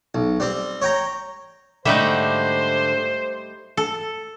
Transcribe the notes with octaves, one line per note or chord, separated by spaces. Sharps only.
B1
G3 C4
C#5 G5 A#5
G#2 D3 G3 A3 D#4 C5 E5
A4